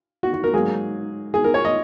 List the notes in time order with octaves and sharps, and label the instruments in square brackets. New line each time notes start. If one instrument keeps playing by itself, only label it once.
[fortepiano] F#4
F#4
A#4
G#2 F#3 A#3 G#4
G#4
A#4
C#5
D#5